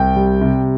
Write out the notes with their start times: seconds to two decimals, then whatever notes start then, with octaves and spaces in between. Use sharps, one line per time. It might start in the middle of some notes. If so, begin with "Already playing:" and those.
Already playing: C2 G5
0.16 G3
0.41 C3